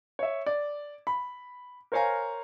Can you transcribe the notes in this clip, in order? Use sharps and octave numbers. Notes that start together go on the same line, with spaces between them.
C#5 E5
D5
B5
A#4 C5 C#5 F5 G#5 A#5